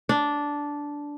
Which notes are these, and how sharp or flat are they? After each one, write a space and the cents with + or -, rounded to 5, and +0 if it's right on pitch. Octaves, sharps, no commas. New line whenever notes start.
D4 -10